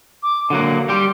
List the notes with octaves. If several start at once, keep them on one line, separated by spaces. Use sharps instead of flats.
D6
D3 F#3 A#3 F#5
G3 G4 C6